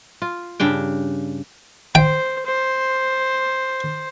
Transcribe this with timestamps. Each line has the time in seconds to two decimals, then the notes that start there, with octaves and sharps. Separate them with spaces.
0.22 F4
0.60 G2 C#3 D4 G5
1.95 C5 G5
2.46 C5